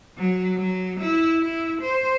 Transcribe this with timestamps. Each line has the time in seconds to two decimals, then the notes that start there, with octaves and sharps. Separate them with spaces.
0.18 F#3
0.57 F#3
1.00 E4
1.40 E4
1.82 C5